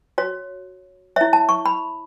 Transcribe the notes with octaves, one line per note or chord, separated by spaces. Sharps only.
F#4 C#5
E4 C#5 E5
A5
C#6
B5